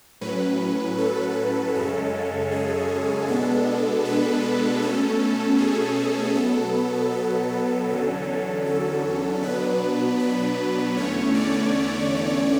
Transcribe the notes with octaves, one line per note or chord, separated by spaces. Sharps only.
A2 F#3 C#4 B4
A4
F#2 C#3 G#3 C#4 A4
G#4
B2 G#3 B3 D4 A4
B4
B2 A3 C#4 A4
G#4
B2 F#3 B3 A4
A4
E2 D3 F#3 C#4 A4
A4
B2 F#3 B3 D4 B4
B4
E2 D3 A3 C#4 C#5
D5